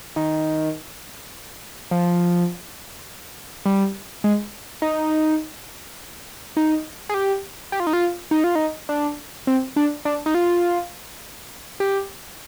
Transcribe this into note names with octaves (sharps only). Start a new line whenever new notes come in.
D#3
F3
G3
G#3
D#4
D#4
G#4
G4
G4
F4
D#4
F4
D#4
F4
D#4
D4
C4
D4
D4
D#4
F4
G4